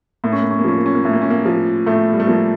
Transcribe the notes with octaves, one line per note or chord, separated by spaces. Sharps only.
A2 A#3
C#4
A#3
C#4
A#3
F3 C#4
A#3
C#4
A#3
A2 C#4
A#3
C#4
A#3
F3
A2 A3
G3
A3
F3 A#3